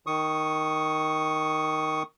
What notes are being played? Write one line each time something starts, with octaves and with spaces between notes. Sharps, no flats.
D#3 C#6 D#6